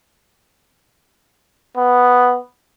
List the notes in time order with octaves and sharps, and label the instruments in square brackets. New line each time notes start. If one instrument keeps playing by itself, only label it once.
[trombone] B3